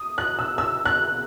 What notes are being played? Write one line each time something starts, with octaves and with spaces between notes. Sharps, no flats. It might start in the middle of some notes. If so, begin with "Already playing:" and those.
Already playing: D#6
F#6
E6
E6
F#6